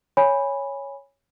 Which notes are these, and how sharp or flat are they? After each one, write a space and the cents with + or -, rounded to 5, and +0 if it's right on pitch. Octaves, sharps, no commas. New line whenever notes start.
C#5 +0 G#5 -15 B5 -5